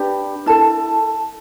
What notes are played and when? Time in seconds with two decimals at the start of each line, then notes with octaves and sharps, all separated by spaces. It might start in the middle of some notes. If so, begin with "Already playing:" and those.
Already playing: D4 G4 B4
0.46 E4 A4 A5